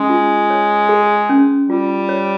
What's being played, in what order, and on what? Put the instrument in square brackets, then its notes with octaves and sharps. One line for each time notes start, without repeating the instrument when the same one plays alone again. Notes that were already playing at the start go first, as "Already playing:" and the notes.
Already playing: [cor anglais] G#3 [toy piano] C#4
[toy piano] F4
C#5
G#4
C#4
[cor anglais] G3 [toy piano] F4
[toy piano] C#5